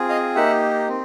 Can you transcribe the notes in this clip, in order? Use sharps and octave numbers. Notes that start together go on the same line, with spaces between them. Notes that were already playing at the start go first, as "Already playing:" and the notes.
Already playing: C4 F4 G#4
D#5 F5
A#3 D#4 G4 E5 F#5
C4